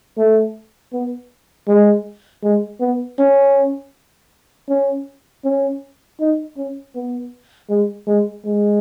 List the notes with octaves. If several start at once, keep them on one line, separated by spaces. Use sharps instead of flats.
A3
B3
G#3
G#3
B3
C#4
C#4
C#4
D#4
C#4
B3
G#3
G#3
G#3